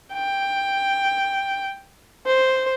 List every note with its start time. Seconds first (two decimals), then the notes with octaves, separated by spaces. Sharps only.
0.13 G5
2.26 C5